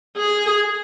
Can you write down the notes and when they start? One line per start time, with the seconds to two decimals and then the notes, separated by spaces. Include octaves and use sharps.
0.17 G#4